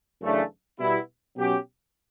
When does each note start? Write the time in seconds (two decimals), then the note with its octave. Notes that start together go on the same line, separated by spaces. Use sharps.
0.21 F#2 C#3 E3 A3 D4
0.79 B2 G3 B3 E4
1.36 B2 F#3 C#4 G4